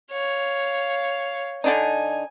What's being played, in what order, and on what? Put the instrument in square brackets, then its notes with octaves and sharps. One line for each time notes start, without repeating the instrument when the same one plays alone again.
[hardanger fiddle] C#5 F5
[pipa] D3 D4 D#4 [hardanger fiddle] G#5